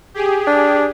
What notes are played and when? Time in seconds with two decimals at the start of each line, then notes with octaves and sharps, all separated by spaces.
0.14 G4 G#4
0.47 D4